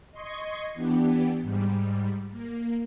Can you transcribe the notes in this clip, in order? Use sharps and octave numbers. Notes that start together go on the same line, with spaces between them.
D#5 C6 C#6 G#6
E3 B3 D4 G4
G#2 G3
A#3